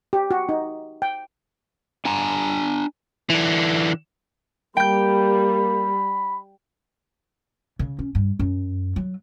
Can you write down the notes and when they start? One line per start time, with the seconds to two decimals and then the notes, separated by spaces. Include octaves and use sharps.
0.13 G4
0.31 F#4
0.49 D#4
1.02 G5
2.05 D4 G#5 A#5
3.30 D3 E3
4.77 G3 A#3 G5 B5 G6
7.79 C#3
7.99 C#4
8.15 G2
8.39 F#2
8.96 F#3